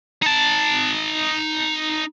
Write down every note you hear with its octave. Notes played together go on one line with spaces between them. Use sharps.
D#4 A5